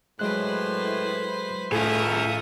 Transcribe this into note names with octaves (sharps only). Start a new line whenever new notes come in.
A2 F#3 G#3 B4 C5 F#6
A2 A3 F4 G#4 E5 D#6